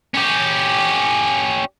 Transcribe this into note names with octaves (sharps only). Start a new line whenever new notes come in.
C#4 G4